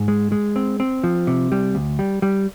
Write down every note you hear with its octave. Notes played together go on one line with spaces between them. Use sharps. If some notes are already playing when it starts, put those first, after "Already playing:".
Already playing: G#2
G#3
G#3
C4
C4
F3
C3
G3
D2
G3
G3